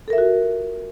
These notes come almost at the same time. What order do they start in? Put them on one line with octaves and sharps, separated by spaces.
A4 A#4 E5 F4 F#4